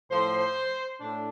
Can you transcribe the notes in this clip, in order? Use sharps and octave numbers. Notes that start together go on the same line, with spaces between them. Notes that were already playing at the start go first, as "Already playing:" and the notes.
A2 F3 C5
A2 D4